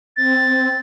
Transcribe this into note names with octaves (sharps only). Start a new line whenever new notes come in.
C4 A6